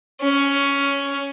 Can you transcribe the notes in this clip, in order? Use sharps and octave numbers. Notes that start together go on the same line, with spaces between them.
C#4